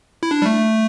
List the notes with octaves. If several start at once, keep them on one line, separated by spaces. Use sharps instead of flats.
E4
D4
G3
A3